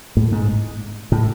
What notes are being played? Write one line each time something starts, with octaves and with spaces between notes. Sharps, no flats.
A2
G#2
A2